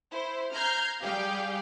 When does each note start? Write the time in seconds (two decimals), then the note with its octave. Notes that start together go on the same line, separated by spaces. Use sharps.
0.12 E4 C5
0.53 A#5 F6 G6 G#6 C7
1.02 G3 G4 G#4 F5 G5